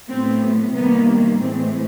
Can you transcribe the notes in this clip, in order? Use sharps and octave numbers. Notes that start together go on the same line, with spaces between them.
A2 F#3 B3 C4
C3 D#3 G3 A#3 B3
A2 E3 G#3 C4